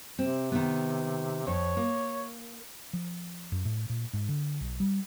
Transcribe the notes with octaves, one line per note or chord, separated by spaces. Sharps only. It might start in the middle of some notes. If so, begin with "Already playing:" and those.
C3 C4
D#3 B3
F2 C#5
A#3
F3
F#2
A2
A#2
G#2
D3
B1
G3